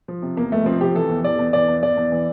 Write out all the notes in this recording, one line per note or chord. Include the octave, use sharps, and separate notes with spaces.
F3
C3
E2 A#3
F1 A3
F3 C4
C3 G4
E3 A4
E2
E3 D5
E2
E3 D5
E2
E3 D5
E2
E3